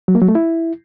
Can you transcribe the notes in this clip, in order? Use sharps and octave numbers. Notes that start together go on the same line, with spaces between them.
F#3
A#3
F#3
A3
E4